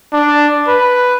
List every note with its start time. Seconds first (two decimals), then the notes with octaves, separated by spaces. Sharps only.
0.13 D4
0.68 B4